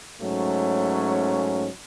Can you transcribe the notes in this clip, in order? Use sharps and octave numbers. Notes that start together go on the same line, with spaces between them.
G#2 F#3 A3 C#4